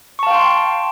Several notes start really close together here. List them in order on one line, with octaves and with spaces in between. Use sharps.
C#6 A5 F5 G5 C6